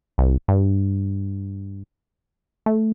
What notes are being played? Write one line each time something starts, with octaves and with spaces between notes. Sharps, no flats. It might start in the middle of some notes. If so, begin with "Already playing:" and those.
C2
G2
A3